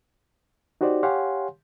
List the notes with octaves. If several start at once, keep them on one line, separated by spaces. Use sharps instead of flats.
D#4 F#4 G4 C5 D5
G4 C#5 F5 F#5 G#5 C6